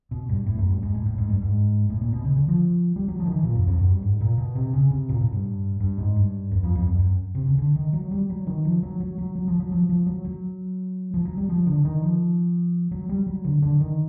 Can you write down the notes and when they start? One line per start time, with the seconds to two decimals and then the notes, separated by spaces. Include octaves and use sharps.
0.11 B2
0.29 G2
0.46 A2
0.59 F#2
0.70 G2
0.83 G#2
0.94 A2
1.06 A2
1.18 G#2
1.29 G2
1.42 G#2
1.90 A2
2.01 A#2
2.13 B2
2.25 C#3
2.37 D3
2.48 F3
2.96 G3
3.08 F#3
3.20 F3
3.26 D#3
3.32 E3
3.43 A#2
3.55 F#2
3.67 F2
3.79 F#2
3.90 G2
4.03 G#2
4.21 A#2
4.38 B2
4.55 C3
4.73 C#3
4.91 C3
5.09 A#2
5.21 A2
5.33 G2
5.80 G2
5.98 G#2
6.16 G2
6.51 F#2
6.63 F2
6.75 F2
6.87 F#2
6.99 F#2
7.35 C3
7.46 C#3
7.58 D3
7.76 D#3
7.93 F#3
8.11 G3
8.30 F#3
8.47 D#3
8.65 F3
8.83 F#3
9.00 F#3
9.18 F#3
9.35 F#3
9.48 F3
9.60 F#3
9.72 F3
9.89 F3
10.06 F#3
10.25 F#3
11.14 F3
11.25 F#3
11.38 G3
11.49 F3
11.67 D3
11.85 D#3
12.02 F3
12.91 F#3
13.09 G3
13.27 F#3
13.44 D3
13.62 D3
13.80 D#3